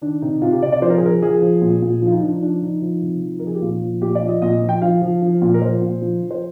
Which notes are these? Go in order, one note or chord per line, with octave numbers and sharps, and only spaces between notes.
D#3 D4
C3 D#4
C3 F4
G4
C3 D5
D5
F3 C5
A#4
G#4
F3 A#4
F3 G#4
F3
A#2
A#2
F3
F4
D#4
F3 D4
D#4
F3 D4
F3 D#4
F3
C3
F3
F3 A#4
G#4
G4
A#2 F4
F3
A#2 G4
D5
F3
D#5
A#2 D#5
F3
G5
F3 F5
F3
F3
A#2
A#4
F3 C5
A#2
F3
F3
C5